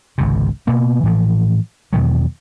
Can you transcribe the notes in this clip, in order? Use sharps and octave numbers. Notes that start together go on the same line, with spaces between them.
G#1 C#2 C3
B2 A#3 B3
A2 E3 F3
E2 B2 D#3 F#3